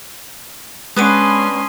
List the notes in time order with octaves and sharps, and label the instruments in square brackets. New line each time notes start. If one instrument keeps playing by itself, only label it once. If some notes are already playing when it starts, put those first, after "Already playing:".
[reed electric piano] G#3 [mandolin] B3 D4 B4 [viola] C#4 C6 [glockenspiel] D#6 D#7